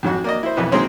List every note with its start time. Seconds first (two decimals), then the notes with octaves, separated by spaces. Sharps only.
0.03 F2 G#2 F#3 F#4
0.24 A#3 D5 D#5
0.43 E4 C5
0.57 B1 F2 E3 B3
0.72 D#3 F#3 G#3 A#3 C4 C#4